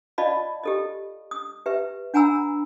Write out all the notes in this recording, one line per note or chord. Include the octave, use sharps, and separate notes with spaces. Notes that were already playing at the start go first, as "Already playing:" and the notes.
F4 D5 D#5 F5 A5 B5
G4 A4 D#5
D#6
G4 B4 E5
D4 F#5 G#5 A#5 B5 E6